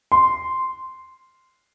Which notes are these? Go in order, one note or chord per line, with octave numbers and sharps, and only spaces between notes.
C6